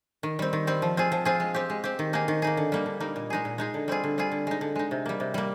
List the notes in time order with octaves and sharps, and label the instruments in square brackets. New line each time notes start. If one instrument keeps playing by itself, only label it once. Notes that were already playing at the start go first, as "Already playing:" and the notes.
[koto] D#3
G3 C4
D#3
G3 C4
F3
C4 F4 G#4
F3
C4 F4 G#4
G#3
C4 G4
G#3
C4 G4
D#3
A#3 D#4 G#4
D#3
A#3 D#4 G#4
D3
G3 A#3 D#4
D3
G3 A#3 D#4
A#2
G#3 D#4 G#4
A#2
G#3 D#4 G#4
D3
G3 C4 F4 G#4
D3
G3 C4 F4 G#4
D3
G#3 D#4
D3
G#3 D#4
C3
G3 A#3
C3
G3 A#3